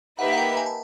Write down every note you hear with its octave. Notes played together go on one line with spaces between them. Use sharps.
A#3 D#4 G4 B4 E5 F#5
F#5
G5
G#5
A5